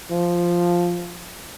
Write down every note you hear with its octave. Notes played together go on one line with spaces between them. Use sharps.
F3